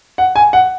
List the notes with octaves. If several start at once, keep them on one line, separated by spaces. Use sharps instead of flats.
F#5
G#5
F#5